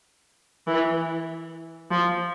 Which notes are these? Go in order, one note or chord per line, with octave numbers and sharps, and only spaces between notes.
E3
F3